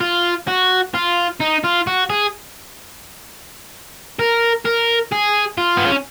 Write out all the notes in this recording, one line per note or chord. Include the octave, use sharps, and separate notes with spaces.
F4
F#4
F4
D#4
F4
F#4
G#4
A#4
A#4
G#4
F4
B3
C#4